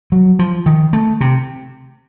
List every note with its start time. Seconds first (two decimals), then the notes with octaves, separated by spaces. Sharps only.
0.12 F#3
0.39 F3
0.66 D#3
0.93 A3
1.21 C3